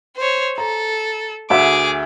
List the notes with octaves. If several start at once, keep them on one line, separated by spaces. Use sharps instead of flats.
C5 C#5
A4 A#5
D2 F#4 G#4 E5 D6